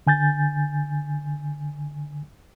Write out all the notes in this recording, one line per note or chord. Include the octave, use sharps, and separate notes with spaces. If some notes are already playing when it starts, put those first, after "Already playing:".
D3 G#5 G6 A6